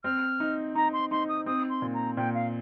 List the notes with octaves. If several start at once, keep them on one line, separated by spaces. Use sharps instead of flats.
C4 F6
D#4
D#4 A#5
C6
D#4 C6
D#6
C4 D#6
C6
A#2
A#5
A#2 G5
F5